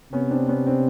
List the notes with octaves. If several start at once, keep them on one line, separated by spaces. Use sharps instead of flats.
C3 B3 C#4
C4 D4
B3 C#4
C4 D4